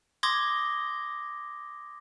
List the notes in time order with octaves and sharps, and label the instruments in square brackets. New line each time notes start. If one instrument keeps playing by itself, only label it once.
[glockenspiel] C6 D6 D#6 G#6 A#6 G7